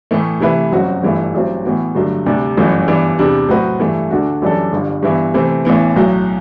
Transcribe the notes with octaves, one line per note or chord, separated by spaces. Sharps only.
A2 E3 A3
C3 E3 A3 E4 B4
G1 F#2 F#3 C4 F#4
G1 G2 E3 A3 E4
A1 G2 F#3 C4
A2 E3 B3 F#4
G2 D3 F#3 A3
D2 C3 G3 D4
G1 F#2 E3 A3
G2 E3 B3 D4
E2 C3 G3 D4
A2 F#3 C4 F#4 B4
G2 E3 A3 E4
D2 D3 A3 D4 F#4
F#2 E3 G3 D4 A4
G1 G2 D3
G2 E3 B3 E4
C3 E3 A3 C4
A1 A2 E3 B3
B1 A2 F#3